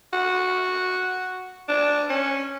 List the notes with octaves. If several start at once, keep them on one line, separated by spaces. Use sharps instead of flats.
F#4
D4
C#4